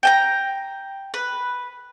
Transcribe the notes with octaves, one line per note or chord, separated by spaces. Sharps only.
G5 G#5 A#5
B4